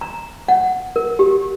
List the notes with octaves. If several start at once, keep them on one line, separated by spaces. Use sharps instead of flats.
A#5
F#5
A#4
G4